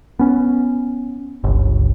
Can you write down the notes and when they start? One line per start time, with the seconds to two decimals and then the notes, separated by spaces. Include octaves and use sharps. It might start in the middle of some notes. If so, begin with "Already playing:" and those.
0.19 B3 C#4
1.44 G1 C#2